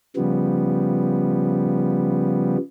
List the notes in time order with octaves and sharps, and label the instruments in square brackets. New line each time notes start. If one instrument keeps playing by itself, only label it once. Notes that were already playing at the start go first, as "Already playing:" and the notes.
[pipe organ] C#3 F3 G3 B3